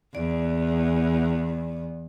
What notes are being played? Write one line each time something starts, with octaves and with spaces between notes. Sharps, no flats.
E2 D5